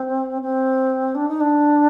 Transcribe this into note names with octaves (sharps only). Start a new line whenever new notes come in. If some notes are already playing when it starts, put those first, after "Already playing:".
Already playing: C4
C4
D4
D#4
D4